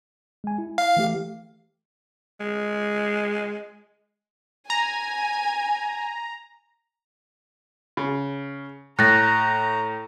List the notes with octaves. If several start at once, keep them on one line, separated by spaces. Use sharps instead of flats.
G#3 G#5
E4
F5
E3 A3 G4
G#3
G#5 A#5
C#3
A2 A#5 F#6 A6 A#6